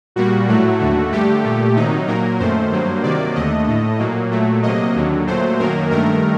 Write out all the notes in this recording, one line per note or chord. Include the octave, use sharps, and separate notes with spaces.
A#2 G3 A#3 F#4
A2 F#3 A3
D#2 D3 A3
G2 D3 A3 G4
A#2 A3
C3 D#3 F#3 D#4
A#2 F#3 A#3 A#4
F#2 D#3 A3 C5
G2 F#3 A#3
C3 D#3 F#3 A#3 D5
D#2 D3 A3 D#5
A2 A3
A#2 F#3 A#3
A#2 F#3 A3
C3 F#3 A#3 D#5
D#2 D3 F#3
A#2 F#3 A3 C5
F#2 D#3 F#3 A#3 A#4
G2 D#3 A3 A#4